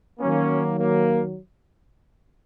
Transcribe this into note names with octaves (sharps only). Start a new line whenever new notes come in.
D#3 F#3 A#3 C#4
A#3